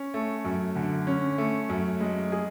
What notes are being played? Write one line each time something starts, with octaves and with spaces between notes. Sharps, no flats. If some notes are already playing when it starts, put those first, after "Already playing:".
Already playing: C#4
A3
F#2
D3
C#4
A3
F#2
G#3
G#4